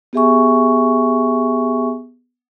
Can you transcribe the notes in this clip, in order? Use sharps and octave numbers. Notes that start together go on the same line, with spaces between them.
B3 G4 G#4 E5 G#5 C#6